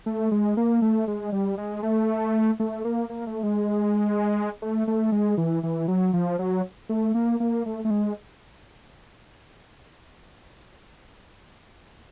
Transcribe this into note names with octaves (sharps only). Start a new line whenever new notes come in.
A3
G#3
A#3
A3
G#3
G3
G#3
A3
A3
A#3
A#3
A3
G#3
A3
A3
G#3
E3
E3
F#3
F3
F#3
A3
A#3
A#3
A3
A3
G#3